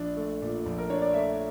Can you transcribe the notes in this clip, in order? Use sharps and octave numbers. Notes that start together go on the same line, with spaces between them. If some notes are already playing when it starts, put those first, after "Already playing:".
Already playing: A#1 D4
A3
A#2
A#1
A#4
D4 C#5
D5
A3 E5